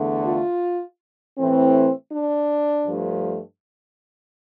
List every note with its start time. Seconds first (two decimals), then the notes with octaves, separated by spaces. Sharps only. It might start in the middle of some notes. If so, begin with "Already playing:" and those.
Already playing: E2 D3 A3
0.25 F4
1.37 A2 E3 A3 C4
2.12 D4
2.87 G2 F3 A3